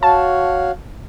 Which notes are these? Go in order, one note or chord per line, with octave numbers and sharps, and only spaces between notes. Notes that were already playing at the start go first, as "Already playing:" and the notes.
F#4 C#5 F5 A5